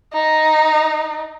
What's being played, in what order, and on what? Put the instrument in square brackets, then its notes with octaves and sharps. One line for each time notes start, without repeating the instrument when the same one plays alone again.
[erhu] D#4